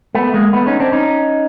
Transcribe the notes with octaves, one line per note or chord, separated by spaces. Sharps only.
A3 B3
G#3 A#3
A3 B3
C#4 D#4
C4 D4
C#4 D#4